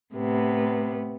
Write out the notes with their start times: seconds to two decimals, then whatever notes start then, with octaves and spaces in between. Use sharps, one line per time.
0.14 A2 C3 B3